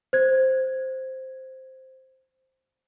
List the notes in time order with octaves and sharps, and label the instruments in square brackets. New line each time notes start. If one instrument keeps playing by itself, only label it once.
[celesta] C5 G#6